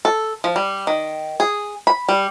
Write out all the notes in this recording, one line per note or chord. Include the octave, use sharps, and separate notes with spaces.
A4
F3
G3
D#3
G#4
B5
G3